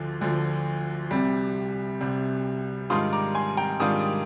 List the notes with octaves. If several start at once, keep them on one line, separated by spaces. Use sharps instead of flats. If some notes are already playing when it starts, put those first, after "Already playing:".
Already playing: D2 D3 F3
D2 D3 F3
C2 C3 G3
C2 C3 G3
G#2 D#3 G3 D4 F4 C6 D#6
A#5 D6
G#5 C6
G5 A#5
G#2 D#3 G3 D4 F4 D#6
D#6